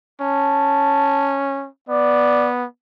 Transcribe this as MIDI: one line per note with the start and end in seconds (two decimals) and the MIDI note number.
0.21 1.68 61
0.21 1.40 81
1.89 2.65 59
1.89 2.47 74